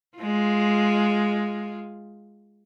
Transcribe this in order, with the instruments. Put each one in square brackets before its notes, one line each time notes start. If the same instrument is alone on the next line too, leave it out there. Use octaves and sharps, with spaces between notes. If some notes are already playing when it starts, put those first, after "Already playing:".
[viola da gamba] G#3 F4